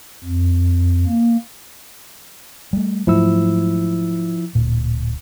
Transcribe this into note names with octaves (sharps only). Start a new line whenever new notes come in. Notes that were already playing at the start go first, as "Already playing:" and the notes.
F2
A#3
G3 A3
G#2 F3 F#3 A3 E4 E6
D1 A#2